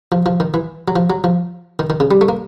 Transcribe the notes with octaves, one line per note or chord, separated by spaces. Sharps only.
F3
F3
D#3
E3
F#3
F3
F#3
F3
D#3
D#3
C#3
G3
A3
A#3